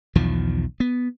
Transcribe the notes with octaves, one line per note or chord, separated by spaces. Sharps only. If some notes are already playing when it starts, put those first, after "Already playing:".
B1 E2 D#3 F3
B3